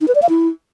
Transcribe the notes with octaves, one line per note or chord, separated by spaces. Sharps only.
D#4
B4
D5
F5
E4